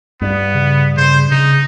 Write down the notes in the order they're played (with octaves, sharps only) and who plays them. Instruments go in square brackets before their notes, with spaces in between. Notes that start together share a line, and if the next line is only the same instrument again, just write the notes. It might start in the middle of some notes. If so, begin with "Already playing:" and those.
[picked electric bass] G2 [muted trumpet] B3
[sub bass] C#3
[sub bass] C#3 [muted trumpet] C5
[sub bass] C#3 [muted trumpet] D#4